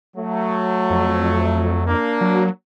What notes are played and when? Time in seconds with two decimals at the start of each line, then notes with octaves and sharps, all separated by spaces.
0.16 F#3 A3
0.90 F2
1.87 A#3 D4
2.21 F#3